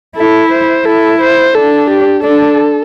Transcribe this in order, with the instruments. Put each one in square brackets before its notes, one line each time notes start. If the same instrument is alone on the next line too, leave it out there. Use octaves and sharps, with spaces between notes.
[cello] E4 [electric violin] A4
[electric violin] C5
[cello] E4 [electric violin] A4
[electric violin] C5
[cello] D4 [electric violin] A4
[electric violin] G4
[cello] D4 [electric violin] A4